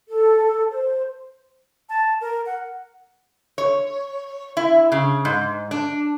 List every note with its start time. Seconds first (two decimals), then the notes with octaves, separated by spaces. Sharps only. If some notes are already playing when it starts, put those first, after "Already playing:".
0.08 A4
0.71 C5
1.89 A5
2.21 A#4
2.46 F#5
3.58 C#5
4.57 E4
4.92 C#3
5.25 G#2
5.71 D4